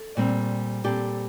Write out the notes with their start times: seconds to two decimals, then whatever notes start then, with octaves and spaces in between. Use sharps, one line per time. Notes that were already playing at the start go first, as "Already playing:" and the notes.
Already playing: A4
0.17 A#2 G3 C4
0.84 A#2 G3 C4 G4 A4